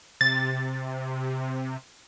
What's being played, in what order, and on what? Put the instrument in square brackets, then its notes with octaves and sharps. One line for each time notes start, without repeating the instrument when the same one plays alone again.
[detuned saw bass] C3 [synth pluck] A6